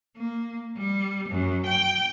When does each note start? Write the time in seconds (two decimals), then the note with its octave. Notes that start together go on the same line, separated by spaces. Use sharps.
0.17 A#3
0.77 G3
1.29 F#2
1.65 G5